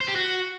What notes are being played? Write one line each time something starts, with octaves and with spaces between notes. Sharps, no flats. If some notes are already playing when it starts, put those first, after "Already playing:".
C5
G4
F#4